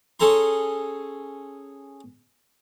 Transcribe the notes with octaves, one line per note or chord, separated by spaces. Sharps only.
C#4 G#4 A4 A#5 C6